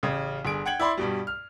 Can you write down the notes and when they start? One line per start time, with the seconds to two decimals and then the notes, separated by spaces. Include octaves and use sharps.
0.03 A1 C#3
0.45 G1 G#4 D7
0.66 F#5 G5 G#6 F#7
0.80 E4 D5 B5 C6
0.97 G2 B2 G3
1.27 F6